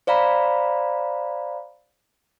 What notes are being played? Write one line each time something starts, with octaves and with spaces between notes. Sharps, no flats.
C5 D5 F5 A#5 B5